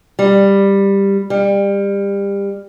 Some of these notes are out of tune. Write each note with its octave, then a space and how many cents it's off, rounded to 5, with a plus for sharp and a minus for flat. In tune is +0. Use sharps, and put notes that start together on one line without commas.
G3 +10
G3 +25